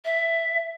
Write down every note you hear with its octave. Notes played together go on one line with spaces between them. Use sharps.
E5